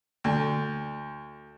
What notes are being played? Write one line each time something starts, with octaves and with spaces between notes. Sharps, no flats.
D2